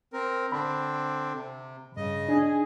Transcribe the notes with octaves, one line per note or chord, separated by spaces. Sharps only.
C4 A#4
D3 C4 D4 B5
C3
G2 C#3 D#5
D4 D#4 G#4